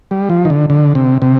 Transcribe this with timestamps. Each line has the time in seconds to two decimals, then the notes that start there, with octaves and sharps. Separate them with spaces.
0.11 G3
0.30 F3
0.45 D#3
0.50 D3
0.70 D3
0.95 C3
1.22 C3